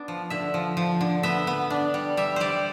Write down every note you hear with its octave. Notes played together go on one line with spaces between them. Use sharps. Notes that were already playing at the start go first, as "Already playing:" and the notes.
Already playing: B3 D4
F3
D3 E5
F3
F3
D3
B3 E5
B3
D4
G3
G3 E5
G3 C5 D5